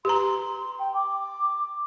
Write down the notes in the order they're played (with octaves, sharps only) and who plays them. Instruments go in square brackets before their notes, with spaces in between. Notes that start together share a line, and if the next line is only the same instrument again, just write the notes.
[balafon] G4 B4 A#5 [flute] C6
[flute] G5
D6